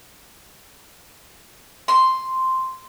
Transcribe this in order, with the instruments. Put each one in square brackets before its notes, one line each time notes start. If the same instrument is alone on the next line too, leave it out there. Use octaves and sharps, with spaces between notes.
[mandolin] C6